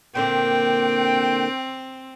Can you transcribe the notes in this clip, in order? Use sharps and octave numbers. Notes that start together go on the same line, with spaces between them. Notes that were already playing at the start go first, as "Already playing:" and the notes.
A#2 D3 A#3 C4 G5